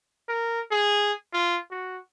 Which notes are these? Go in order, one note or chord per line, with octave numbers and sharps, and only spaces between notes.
A#4
G#4
F4
F#4